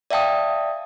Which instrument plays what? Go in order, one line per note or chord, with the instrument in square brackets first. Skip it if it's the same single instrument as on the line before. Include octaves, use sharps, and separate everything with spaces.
[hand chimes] D5 E5 F5 G5 A5 D#6